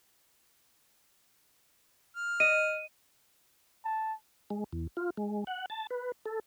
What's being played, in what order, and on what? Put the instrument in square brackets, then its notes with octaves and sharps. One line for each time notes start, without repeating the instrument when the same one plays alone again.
[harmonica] F6
[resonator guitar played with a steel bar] D#5 [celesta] D#7
[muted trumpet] A5
[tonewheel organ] G#3
E2
F4
G#3
F#5
A5
B4
A4